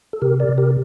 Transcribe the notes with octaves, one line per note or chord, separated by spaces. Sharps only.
A4
C3 G4 A#4
A#4 D5
C3
G4 A#4